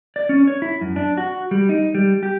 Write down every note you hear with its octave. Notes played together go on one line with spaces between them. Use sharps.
D5
C#4
C#5
E4
F#2
D4
F#4
G3
D#4
G3
G4